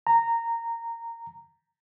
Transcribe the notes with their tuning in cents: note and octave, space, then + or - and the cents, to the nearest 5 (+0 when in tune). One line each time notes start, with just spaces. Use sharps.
A#5 -15